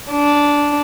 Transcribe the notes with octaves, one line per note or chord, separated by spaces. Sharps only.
D4